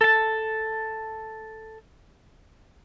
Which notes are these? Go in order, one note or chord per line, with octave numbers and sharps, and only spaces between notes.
A4 A5